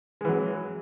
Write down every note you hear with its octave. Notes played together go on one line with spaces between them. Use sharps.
E3 F#3 G#3